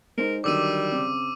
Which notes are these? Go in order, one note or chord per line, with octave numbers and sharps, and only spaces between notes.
G#3 D#4 A#4 C5
D3 D#3 F#3 G3 D6 E6 D#7
C#3 C4